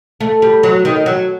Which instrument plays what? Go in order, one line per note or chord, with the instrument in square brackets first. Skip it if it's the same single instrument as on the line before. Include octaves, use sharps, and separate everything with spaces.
[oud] A3
G3
F#3
D#3
F#3